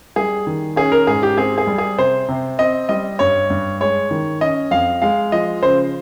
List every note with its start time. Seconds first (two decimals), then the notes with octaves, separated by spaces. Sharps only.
0.16 G3 G#4
0.47 D#3
0.76 C#4 G#4
0.92 A#4
1.07 G#2 G#4
1.23 G4
1.37 C4 G#4
1.58 G#4
1.67 G3
1.78 G#4
1.98 C3 C5
2.28 C3
2.59 C4 D#5
2.89 G3 D#5
3.19 G2 C#5
3.50 G2
3.80 G#3 C#5
4.11 D#3
4.41 C#4 D#5
4.71 F2 F5
5.02 G#3 F5
5.32 F3 D#5
5.63 C#3 C5